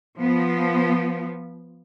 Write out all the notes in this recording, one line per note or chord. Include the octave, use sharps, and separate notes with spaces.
F3 B3